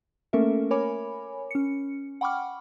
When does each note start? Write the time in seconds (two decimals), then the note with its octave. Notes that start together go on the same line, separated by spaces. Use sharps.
0.33 A3 A#3 C#4 A4 A#4 E5
0.71 A#4 C#5 G#5 B5 D6
1.51 C#4 C#7
2.21 F#5 G5 B5 C#6 D6 F6